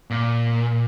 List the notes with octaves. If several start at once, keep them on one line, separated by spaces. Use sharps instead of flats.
A#2